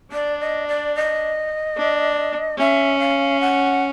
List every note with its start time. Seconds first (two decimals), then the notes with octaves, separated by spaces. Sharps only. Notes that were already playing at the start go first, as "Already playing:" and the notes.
0.12 D4 D5
0.40 D#5
0.68 D5
0.95 D#5
1.77 D4
2.58 C#4 E5
2.99 F5
3.40 F#5